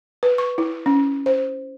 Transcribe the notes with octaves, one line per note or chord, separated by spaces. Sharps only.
B4
C#6
E4
C#4
C5